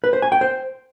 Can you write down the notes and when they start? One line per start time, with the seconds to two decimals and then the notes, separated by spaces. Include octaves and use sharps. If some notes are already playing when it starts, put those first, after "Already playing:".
0.04 B4
0.13 C5
0.22 G#5
0.32 G5
0.41 C5